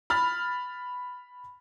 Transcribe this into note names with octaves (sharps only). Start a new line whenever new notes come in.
B5 F6 A6